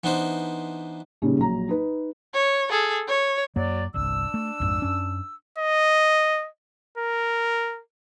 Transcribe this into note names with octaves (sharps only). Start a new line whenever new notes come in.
E3 B3 D4 D#4 C5
A#2 C#3 G3 C#4 D#4
A#1 F#3 A#5
D#4 B4
C#5
G#4 A4
C#5
F#2 F#3 A#3 D5
G1 C2 D4 E6
A3
A#1 F2 G#2
F#2 C#4
D#5
A#4